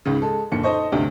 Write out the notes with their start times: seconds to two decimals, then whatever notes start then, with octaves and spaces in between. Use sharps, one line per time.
0.05 C#2 G#2 C#3
0.22 G#3 A4
0.52 F#1 A#2 D3 C#7
0.63 D#4 A4 C5 D#5 C#6
0.92 D2 G2 C3